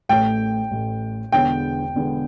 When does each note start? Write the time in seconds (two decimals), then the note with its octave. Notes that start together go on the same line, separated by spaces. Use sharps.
0.09 A1 A2 A3 G5
0.71 A1 A2 A3
1.32 E1 E2 D3 B3 G5
1.94 E1 E2 D3 B3